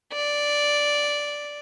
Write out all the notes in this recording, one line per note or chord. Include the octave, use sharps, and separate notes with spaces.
D5